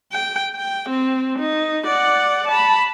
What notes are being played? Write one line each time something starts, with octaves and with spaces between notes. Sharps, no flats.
G5
G5
C4
D#4
D5 F#5
A5 B5